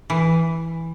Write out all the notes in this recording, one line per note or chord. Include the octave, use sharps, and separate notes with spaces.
E3